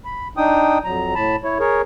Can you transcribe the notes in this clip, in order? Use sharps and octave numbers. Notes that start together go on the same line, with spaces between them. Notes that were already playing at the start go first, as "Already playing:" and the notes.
B5
D4 D#4 G5 D#6
F2 F#3 A#5
A2 A5 B5
E4 C#5
G#4 A#4 C#5